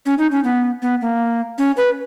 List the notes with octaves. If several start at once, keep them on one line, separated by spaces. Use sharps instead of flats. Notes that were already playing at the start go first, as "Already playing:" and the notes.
C#4
D#4
C#4
B3
B3
A#3
C#4
B4